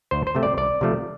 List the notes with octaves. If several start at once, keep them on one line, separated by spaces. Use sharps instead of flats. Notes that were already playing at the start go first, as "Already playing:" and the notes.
D2 C5
C5
C3 A3 C4
D5
C2 D5
C3 F3 A3